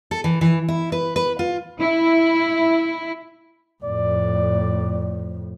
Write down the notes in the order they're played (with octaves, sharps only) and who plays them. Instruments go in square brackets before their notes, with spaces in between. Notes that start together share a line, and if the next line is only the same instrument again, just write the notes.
[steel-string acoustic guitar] A4
E3
E3
E4
B4
B4
F4
[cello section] E4
[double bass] F2 A2 [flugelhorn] D5